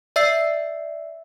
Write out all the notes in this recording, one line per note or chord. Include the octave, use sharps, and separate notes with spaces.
D5 E5 E6 C7